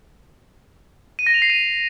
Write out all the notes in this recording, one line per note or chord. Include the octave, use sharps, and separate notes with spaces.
D#7
A#6
F7
C7
D#7